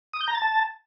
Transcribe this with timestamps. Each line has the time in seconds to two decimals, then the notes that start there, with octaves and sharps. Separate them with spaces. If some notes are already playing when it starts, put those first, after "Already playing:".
0.13 D#6
0.21 G6
0.28 A#5
0.35 A6
0.42 A5